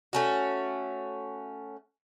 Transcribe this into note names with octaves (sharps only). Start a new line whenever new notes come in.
A3 C#4 F#4